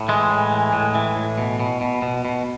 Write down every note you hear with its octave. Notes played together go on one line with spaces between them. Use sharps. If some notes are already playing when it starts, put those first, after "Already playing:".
Already playing: A2
E3 G#3
A2
E3
A2
E3
A2
B2
B2
B2
B2
B2